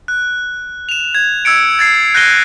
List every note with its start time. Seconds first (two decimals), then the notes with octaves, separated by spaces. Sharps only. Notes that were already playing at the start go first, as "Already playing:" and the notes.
0.08 F#6
0.89 E7 F7
1.15 G#6
1.45 E6 G#6 C#7 D7
1.79 G#6 A6 C7
2.14 F#6 G6 A#6 C7 D#7 G7